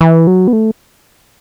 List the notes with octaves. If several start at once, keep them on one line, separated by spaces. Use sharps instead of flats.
E3
F#3
B3
A3